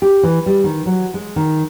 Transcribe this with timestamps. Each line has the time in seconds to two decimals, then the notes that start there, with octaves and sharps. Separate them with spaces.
0.02 G4
0.23 E3
0.46 G3
0.64 D#3
0.86 F#3
1.14 G#3
1.36 D#3